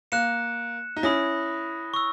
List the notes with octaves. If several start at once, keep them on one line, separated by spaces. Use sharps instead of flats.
A#3 F#6 C#7 E7
D#4
C#4 E4 B5 D#6 A#6
C#6 E6